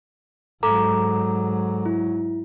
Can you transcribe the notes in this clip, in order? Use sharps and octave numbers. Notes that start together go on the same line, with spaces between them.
G#2 F#3 A4 A#5 D6
E4